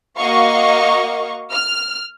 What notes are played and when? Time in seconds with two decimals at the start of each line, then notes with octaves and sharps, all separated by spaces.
0.17 A#3 F#4 D#5 F5 C#6
1.53 F6